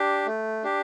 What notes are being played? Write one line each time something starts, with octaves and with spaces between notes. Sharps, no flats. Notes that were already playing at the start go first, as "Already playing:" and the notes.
Already playing: D4 G4
A3
D4 G4